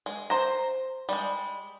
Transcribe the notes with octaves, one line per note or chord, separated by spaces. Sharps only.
G#3
C5 A#5
G3 G#3